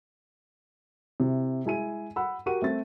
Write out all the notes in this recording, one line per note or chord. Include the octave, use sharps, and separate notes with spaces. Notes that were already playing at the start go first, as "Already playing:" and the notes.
C3 E4
G#3 E4 G#5 D#7
F#5 B5 E6
F#4 G4 A#4 F#5 C#6 D#7
A3 C4 A6